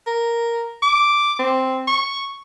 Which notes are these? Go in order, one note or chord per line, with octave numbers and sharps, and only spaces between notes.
A#4
D6
C4
C#6